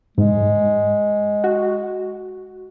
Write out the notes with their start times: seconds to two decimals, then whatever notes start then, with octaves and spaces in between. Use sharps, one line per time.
0.18 G#2 G#3
1.44 F#4